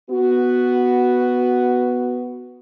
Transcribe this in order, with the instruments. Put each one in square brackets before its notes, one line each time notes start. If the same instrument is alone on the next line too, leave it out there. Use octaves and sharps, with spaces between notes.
[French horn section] B3 F#4